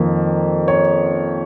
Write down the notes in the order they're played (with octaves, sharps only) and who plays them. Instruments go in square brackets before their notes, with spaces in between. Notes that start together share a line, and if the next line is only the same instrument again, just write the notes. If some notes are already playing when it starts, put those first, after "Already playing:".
Already playing: [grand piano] F2 D#3 A#3
C#5